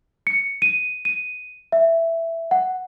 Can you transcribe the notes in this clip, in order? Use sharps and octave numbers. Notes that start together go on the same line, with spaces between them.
C#7
D#7
D#7
E5
F#5